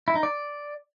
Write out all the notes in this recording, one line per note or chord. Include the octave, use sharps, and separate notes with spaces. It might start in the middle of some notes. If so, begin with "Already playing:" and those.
E4
D#4
D5